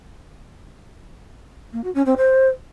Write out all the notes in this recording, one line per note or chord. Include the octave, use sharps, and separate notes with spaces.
A#3
F#4
C#4
C4
C5